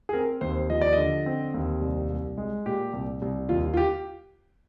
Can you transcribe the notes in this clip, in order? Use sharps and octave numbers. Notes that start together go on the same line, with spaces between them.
G#4
C4 A#4
D#2 C5
F3 D#5
D5
D3 D#5
C4
D#2
C2
C2
G#3
A#2 G4
C2
C2
D#2 F4
F4
G4